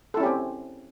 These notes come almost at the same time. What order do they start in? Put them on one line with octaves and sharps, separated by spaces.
A4 E4 C#4 G4 C4